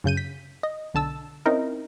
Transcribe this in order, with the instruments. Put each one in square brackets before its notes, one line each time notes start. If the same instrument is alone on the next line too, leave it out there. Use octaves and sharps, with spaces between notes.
[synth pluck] F#2 C#3 G6 D#7
B6
D#5
B1 D3 A5 E6
C4 C#4 D#4 E4 A#4